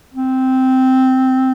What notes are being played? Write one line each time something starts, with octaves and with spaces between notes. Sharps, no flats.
C4